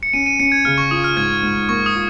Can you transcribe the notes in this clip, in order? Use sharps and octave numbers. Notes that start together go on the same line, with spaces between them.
C#7
C#4 D#7
D#7
C#4 C#7
G#6
C#3 F6
C#6
F4 D#6
F6
G#2 G#6
G#2
A#3 C#6
D#6
F4